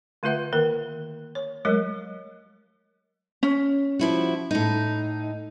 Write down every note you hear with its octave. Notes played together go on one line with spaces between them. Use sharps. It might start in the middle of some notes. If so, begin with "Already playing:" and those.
D3 A3 F4 B4 E5 F#5
D#3 A#3 A#4
C#5
F#3 G#3 A3 A#4 C#5 D#5
C#4
F3 E4 F#4
A2 D#4